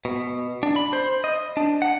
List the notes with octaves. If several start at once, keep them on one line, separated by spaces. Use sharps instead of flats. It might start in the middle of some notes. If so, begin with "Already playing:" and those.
B2
D4
B5
C5
D#5
D4
F#5